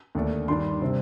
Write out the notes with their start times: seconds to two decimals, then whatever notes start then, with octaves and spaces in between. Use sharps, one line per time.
0.15 D#2 D3 A3 D4
0.48 G2 D#3 G3 D4 C6
0.82 C3 G3 C4